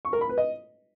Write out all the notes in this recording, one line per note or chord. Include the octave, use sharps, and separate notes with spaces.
C#6
A#4
B5
B4
D#5